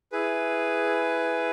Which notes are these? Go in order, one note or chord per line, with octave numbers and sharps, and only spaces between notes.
E4 G#4 B4